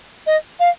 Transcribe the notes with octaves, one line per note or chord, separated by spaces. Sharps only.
D#5
F5